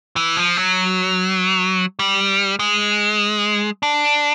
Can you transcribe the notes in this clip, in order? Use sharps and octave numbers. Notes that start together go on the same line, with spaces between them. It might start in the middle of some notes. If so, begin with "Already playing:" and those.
E3
F3
F#3
G3
G#3
D4